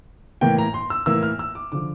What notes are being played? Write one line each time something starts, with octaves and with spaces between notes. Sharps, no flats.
A2 E3 A#3 G5
A#5
C6
E6
A2 E3 A#3 E6
F6
E6
D6
D3 F3 D6